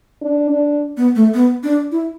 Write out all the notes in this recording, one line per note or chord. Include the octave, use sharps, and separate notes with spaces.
D4
D4
B3
A3
B3
D4
E4